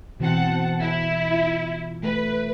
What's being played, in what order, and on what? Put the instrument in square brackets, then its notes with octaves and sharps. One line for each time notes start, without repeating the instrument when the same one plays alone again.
[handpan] B2 E3 [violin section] C4 F#5 A5
[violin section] E4
[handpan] F4
[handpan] A3 [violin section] B4